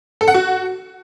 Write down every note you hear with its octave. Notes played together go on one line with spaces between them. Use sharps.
A4
F#5
F#4